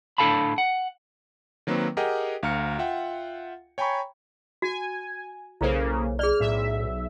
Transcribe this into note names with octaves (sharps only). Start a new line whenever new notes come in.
A2 D4 A4 F5 A5 B5
F#5
D#3 F#3 A#3 C4 B4
G4 G#4 A#4 D#5 F#5 G5
D2 F5 A#5 F6 C#7
F4 E5 F#5 G5
C#5 G5 G#5 A#5 B5 C#6
F#4 G#5
B1 C#3 A#3 E4 A4 C5
G#4 D5 F6
B1 A2 E5